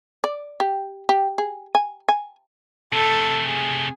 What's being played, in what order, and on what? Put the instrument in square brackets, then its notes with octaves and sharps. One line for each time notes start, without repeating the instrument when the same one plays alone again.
[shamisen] D5
G4
G4
G#4
G#5
G#5
[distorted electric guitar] C3 A3 [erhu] A4
[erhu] G#4